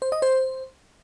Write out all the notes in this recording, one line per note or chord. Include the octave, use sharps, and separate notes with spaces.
C5
D#5
C5